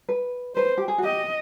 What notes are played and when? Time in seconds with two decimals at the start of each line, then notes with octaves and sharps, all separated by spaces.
0.09 B4
0.55 B4 C5
0.78 G4
0.88 G#4
0.98 F#4
1.03 G4 D#5